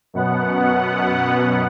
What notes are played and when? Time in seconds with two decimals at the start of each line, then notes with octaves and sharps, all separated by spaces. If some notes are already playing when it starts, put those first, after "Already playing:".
0.14 F#2 B2 B3 F#5